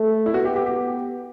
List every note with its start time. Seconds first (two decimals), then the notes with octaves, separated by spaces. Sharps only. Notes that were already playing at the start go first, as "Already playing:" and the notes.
Already playing: A3
0.26 E4
0.34 B3 F#4
0.45 G4
0.56 G4
0.66 G4